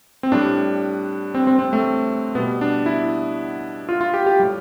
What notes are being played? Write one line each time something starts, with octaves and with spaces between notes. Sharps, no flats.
C4
A2 G3 D4
C4
C4
C4
A3
B2 G3 B3
D4
E4
F4
F4
G4
G4
A2 G3